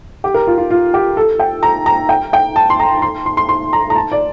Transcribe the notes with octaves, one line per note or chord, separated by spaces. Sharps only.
G4
A#4
F4
F4
F4
G4
A4
G5
A#5
A#5
G5
G5
A5
C6
A#5
C6
C6
C6
C6
A#5
A#5
A5
D5